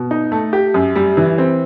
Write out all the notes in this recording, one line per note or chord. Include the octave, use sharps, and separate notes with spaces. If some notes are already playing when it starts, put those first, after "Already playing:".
Already playing: B2
D#4
A3
G4
F#2
G3
E3
C4